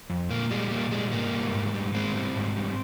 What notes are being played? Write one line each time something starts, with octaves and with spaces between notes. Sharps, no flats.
F2
A#2 A#3
G3 G#3
A#2 A#3
G3 G#3
G#2 A#3
G3
G#2
G3
G#2 G#3 C4
G3
G#2
G3